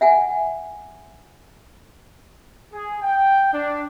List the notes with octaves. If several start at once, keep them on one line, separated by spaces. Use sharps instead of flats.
E5 F#5 G#5
G#4
G5
D4